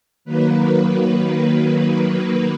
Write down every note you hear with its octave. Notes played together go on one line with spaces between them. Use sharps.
D#3 F#3 A#3 B4